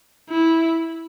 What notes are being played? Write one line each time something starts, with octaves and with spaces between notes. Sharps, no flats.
E4